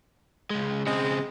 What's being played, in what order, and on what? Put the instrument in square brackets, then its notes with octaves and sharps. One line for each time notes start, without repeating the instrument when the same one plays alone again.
[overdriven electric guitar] C#2 G#3
[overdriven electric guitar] C#3 C4 [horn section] G#3